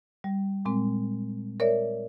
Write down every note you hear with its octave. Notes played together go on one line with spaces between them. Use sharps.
G3
A#2 G#3 C4
A#4 C#5 D5 E5